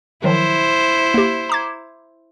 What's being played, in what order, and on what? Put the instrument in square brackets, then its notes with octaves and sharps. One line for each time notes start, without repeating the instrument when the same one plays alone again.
[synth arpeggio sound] D#3 F3 F#3 [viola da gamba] E4 C5
[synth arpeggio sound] A#3 G4
A#5 D6 G#6